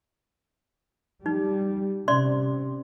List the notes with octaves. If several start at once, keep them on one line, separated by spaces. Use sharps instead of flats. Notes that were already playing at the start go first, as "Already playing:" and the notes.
G3 D#4
C3 C#4 D5 C6